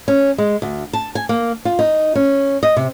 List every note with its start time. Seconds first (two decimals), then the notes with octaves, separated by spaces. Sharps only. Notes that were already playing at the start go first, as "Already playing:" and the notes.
0.08 C#4
0.38 G#3
0.62 D2
0.93 A5
1.15 G#5
1.29 A#3
1.65 F4
1.79 D#4
2.15 C#4
2.63 D#5
2.77 C3